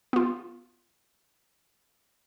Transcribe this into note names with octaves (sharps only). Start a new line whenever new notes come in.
B3 F4